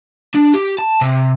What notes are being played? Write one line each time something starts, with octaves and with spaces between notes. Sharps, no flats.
D4
G4
A5
C3